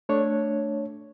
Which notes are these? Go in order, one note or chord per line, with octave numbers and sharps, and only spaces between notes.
A3 D4 C#5